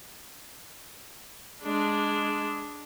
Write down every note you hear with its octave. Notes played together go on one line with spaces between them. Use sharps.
G#3 D4